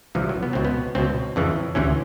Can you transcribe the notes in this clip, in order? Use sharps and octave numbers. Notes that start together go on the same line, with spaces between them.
C2 C3 E3 F3
F#3
B3
C#2 B2 C4
B3
C#2 B2 C4
F2 C#3 E3
D2 C3 E3 C#4